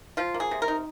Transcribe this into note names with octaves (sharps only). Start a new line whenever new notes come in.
F3 F4
A#3
G#4
C3
A#4
D#4